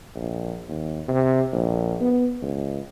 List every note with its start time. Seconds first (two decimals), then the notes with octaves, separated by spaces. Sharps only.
0.15 A#1
0.68 D#2
1.08 C3
1.52 A#1
2.01 B3
2.42 C#2